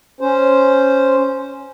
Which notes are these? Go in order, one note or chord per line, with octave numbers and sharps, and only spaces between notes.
C#4 C5